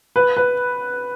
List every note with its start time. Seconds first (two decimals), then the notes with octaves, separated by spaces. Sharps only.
0.16 B4
0.37 B4